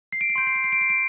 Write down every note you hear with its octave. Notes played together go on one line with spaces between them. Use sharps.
C7
D7
C7
C6 G6 D7
C7
D7
C7
D7
C7
D7